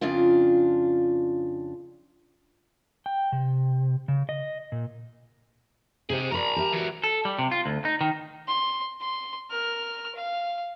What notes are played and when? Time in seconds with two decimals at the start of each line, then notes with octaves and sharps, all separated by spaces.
0.01 F2 C#3 D4 F4
3.06 G5
3.32 C3
4.08 C#3
4.29 D#5
4.72 A#2
6.10 C3 G4 G#4 C5
6.32 F#4 A#4 D5 A#5 B5
6.56 G4 A#4 E5
6.73 E3 F#4
7.04 A4
7.25 G3
7.39 C3
7.51 F4
7.66 D2
7.85 D#4
8.01 D#3
8.48 C6
9.00 C6
9.50 A#4 F6
10.15 F5